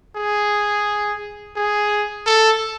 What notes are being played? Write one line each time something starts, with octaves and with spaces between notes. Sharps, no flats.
G#4
G#4
A4